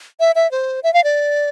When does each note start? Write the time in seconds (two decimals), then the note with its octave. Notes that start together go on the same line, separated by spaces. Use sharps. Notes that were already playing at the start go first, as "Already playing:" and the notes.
0.20 E5
0.35 E5
0.51 C5
0.83 E5
0.93 F5
1.04 D5